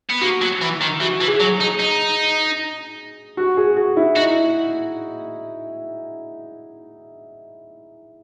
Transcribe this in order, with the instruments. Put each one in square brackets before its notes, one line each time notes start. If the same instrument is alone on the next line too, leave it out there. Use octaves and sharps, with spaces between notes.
[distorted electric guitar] B3
[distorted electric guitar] A#3 [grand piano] F#4
[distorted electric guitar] F#3
E3
D#3
[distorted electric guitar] E3 [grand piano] F#4
[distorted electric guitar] E3
[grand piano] G#4
[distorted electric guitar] F#3
[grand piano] G#4
[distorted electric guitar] D#4
D#4
[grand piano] F#4
G#4
F#4
E4
[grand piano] D#4 [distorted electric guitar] F#4